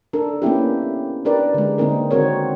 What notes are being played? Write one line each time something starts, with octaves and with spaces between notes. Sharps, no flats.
D4 A4 A#4
A#3 B3 C#4 E4 G4
D4 G4 A#4 B4 D5
D3 G#3
D3 A#3 C4 D#4 A#4
D#3 C4 F#4 A#4 C#5